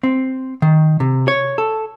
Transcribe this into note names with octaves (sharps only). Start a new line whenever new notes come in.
C4
D#3
C3
C#5
A4